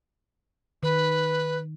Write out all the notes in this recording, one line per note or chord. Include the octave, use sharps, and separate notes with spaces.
D#3 B4